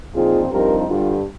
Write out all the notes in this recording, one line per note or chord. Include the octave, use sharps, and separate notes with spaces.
A#2 F3 C4 D#4 F4 G#4
G2 F3 C4 D#4 G4 A#4
G2 D3 G3 F4